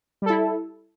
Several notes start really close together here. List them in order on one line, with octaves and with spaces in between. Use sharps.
G3 A4 E4